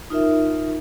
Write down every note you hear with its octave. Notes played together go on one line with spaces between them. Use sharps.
D#4 F4 A#4 E5